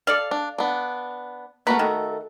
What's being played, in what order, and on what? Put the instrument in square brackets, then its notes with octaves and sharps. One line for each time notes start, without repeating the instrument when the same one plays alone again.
[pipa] A4 D5 F5
[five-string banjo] D4
B3 D4
[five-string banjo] A3 F#4 A#4 [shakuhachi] A#3 [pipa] B4
[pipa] D#3 [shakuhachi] A4